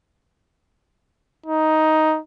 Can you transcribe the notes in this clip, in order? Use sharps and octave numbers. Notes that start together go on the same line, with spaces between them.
D#4